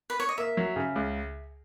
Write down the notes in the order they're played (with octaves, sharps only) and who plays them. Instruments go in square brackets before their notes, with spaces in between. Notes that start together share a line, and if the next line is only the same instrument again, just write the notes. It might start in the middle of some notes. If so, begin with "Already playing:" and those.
[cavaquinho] B4
C#5
D#5
[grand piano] A#3 [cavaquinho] E5
[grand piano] F#3
C#3
C#2